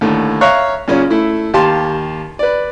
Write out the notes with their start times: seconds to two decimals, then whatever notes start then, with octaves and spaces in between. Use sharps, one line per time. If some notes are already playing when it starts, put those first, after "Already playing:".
0.01 D#2 A2 D3
0.41 C#5 E5 F5 A#5 C#6 F#6
0.88 F#2 A#2 C#3 C#4
1.10 A3 E4
1.54 D#2 G4 F5 A5 C6
2.39 B4 D5